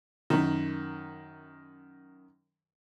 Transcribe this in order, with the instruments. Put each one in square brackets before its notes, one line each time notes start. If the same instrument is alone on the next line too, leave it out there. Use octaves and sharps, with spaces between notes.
[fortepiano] F#2 D#3